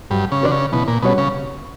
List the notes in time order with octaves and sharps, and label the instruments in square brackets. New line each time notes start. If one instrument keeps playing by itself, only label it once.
[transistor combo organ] G2 [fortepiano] F#3
[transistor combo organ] C#3
[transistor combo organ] D3 [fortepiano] C#4 F#4 B4 D5
[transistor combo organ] C#3
[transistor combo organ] B2 [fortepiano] E3
[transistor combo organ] A#2
[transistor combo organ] B2 [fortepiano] G3 C#4 F#4 C#5
[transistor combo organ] C#3